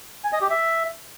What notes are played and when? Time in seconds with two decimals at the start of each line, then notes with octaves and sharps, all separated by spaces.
0.24 G#5
0.33 D#5
0.41 G4
0.50 E5